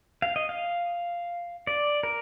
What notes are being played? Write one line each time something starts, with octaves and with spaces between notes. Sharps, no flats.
F5
D#5
F5
D5
A#4